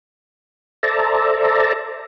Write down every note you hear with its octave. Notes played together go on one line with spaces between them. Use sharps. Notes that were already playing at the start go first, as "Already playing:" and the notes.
A4 C5 D5 E5 A5 A#5